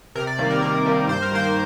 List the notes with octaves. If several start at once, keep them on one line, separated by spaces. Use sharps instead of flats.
C3 A#4
D5
D#3 G3 A#3
A#4
C3 A#4
D#3 G3 A#3
G2 C5
A#4
D#3 A#3 C5